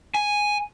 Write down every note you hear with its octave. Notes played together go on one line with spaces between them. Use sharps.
G#5